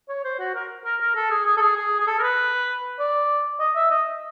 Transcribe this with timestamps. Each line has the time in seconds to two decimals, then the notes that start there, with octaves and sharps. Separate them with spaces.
0.09 C#5
0.24 C5
0.39 F#4
0.55 A#4
0.85 A#4
1.01 A#4
1.15 A4
1.31 G#4
1.46 G#4
1.57 A4
1.61 G#4
1.76 G#4
1.99 G#4
2.07 A4
2.18 A#4
2.22 B4
2.99 D5
3.59 D#5
3.76 E5
3.90 D#5